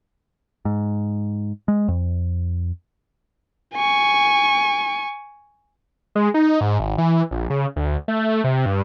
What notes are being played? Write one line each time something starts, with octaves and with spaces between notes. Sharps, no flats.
G#2
G#3
F2
G#5 C#6
G#3
D#4
G#2
G#1
E3
A#1
C#3
D2
A3
C3
G2